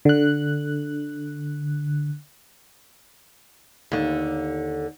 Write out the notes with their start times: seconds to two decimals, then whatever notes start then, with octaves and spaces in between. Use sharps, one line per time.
0.05 D3 F#6
3.92 D#2 D3